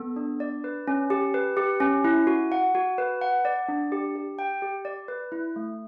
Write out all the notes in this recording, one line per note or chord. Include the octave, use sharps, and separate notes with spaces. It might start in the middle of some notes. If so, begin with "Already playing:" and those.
Already playing: B3 A4
D4
D5
B4
C#4
G4
B4
G4
C#4
E4
F#4
F#5
F#4
B4
F#5
D5
D4
G4
G4
G5
G4
D5
B4
E4
A3